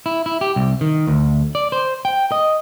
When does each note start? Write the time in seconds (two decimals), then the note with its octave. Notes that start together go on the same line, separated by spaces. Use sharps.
0.06 E4
0.26 E4
0.41 G4
0.56 C2
0.81 D#3
1.07 D2
1.55 D5
1.72 C5
2.05 G5
2.32 D#5